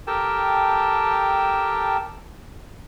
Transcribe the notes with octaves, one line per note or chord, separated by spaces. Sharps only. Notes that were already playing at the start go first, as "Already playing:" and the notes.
G4 A4 A#4 G5 A5